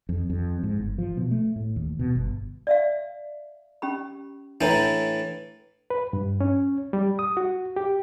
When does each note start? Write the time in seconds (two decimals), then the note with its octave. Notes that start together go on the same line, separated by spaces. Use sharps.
0.09 F2
0.30 F2
0.63 G#2
0.79 G1
0.98 F3
1.17 B2
1.31 A3
1.56 A2
1.76 D#2
1.99 B2
2.15 G1
2.67 D5 E5 F5
3.82 C#4 G4 B5
4.61 A2 E3 D4 A#5
5.90 B4
6.13 G2
6.40 C#4
6.93 G3
7.19 D#6
7.37 F#4
7.76 G4